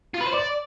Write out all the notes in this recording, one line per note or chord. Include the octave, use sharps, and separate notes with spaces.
F4
B4
C5
D5